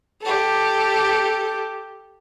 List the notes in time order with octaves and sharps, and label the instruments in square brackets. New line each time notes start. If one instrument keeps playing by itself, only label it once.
[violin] G4 A4